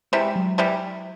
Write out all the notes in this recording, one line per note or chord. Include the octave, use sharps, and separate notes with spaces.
C3 E3 G3 G#3
F#3
C3 E3 G3